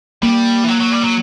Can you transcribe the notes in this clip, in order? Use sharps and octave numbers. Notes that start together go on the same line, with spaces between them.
G3 A#3
E3
F#3
F#3
G3
F#3